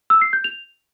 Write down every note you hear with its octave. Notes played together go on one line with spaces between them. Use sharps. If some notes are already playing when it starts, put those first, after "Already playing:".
E6
C7
G6
F7